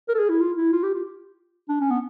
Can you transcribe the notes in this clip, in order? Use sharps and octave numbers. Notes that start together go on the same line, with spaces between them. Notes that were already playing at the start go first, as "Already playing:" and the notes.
A#4
A4
G#4
E4
F4
E4
F4
G4
F4
D4
C#4
B3